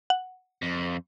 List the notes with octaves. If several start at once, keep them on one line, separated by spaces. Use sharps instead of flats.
F#5
F2